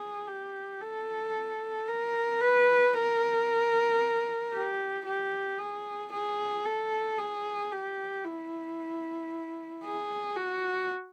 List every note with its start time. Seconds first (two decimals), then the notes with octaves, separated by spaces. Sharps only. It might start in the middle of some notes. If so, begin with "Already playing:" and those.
Already playing: G#4
0.27 G4
0.81 A4
1.88 A#4
2.40 B4
2.94 A#4
4.53 G4
5.05 G4
5.58 G#4
6.12 G#4
6.65 A4
7.18 G#4
7.71 G4
8.24 E4
9.84 G#4
10.36 F#4